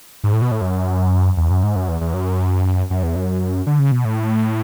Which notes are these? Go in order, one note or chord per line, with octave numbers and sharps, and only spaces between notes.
G#2
A2
B2
A2
F#2
E2
F#2
G#2
F#2
E2
E2
F#2
F#2
E2
F#2
D3
C#3
B2
A2